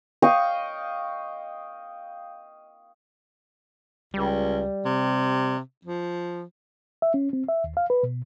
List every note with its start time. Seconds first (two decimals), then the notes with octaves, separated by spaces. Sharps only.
0.22 D#5 F5 G5 C#6
4.14 C#2 G3
4.85 C3
5.85 F3
7.02 E5
7.14 C#4
7.33 C4
7.48 E5
7.64 D#2
7.77 F5
7.90 B4
8.03 B2